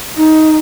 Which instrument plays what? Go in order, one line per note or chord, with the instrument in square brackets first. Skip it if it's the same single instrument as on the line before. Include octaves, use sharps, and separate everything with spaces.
[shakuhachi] D#4